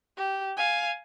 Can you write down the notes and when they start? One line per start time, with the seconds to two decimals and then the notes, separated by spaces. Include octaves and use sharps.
0.17 G4
0.57 F5 G#5